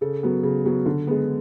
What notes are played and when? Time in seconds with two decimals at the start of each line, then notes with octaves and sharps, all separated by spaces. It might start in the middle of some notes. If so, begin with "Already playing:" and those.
0.01 C#3 A4
0.23 F#3 B3
0.43 C#3
0.65 F#3 B3
0.86 D3
1.07 G#3 B3